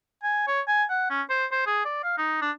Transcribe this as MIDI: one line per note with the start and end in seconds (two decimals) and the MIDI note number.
0.23 0.47 80
0.47 0.61 73
0.68 0.84 80
0.90 1.06 78
1.10 1.22 61
1.30 1.45 72
1.52 1.65 72
1.66 1.81 68
1.85 2.00 74
2.04 2.16 77
2.18 2.39 63
2.41 2.51 62